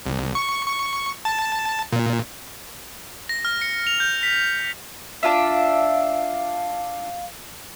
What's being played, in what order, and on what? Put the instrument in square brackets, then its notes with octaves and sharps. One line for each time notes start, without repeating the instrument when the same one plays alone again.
[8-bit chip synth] C2
C#6
C#6
A5
A#2
[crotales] A#6
F6
C#7
F7
G6
B6
[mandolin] D4 F4 E5 [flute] F5